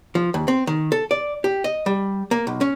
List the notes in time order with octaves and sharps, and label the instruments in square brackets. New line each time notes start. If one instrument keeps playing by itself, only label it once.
[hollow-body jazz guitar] F3
D#2
C4
D#3
A4
D5
G4
D#5
G3
A#3
B1
C#4